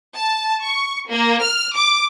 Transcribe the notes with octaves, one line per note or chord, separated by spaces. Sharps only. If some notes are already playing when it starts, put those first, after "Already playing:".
A5
C#6
A#3
F6
D6